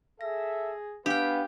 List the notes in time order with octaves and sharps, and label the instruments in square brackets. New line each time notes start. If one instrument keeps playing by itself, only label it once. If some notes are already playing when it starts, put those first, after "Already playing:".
[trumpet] G#4 [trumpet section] A4 E5 [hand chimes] A#6
[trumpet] B3 [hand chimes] D4 [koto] G4 G5 [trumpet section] B4 F5